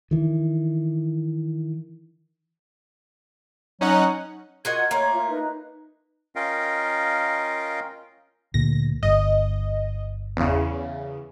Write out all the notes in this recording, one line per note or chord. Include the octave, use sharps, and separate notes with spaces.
D#3 E3
F#3 C#4 D#4 F#5
F4 F#4 A#4 D#5 F#5 G#6
A3 A#3 C#5 C6
F4
D#4 B4
C#4 F4 A#4 D#5 F5 G5
D2 A#2 A#6
G1 D#5
E2 C#3